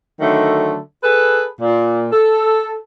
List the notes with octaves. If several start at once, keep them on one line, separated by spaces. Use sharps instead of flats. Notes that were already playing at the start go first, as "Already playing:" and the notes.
D3 D#3 F#3 A3
G#4 A4 B4
A#2
A4